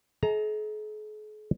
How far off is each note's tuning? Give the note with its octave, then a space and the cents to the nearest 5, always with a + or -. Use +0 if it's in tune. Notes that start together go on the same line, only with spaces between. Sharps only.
G#4 +45 D#5 +45 A#5 +0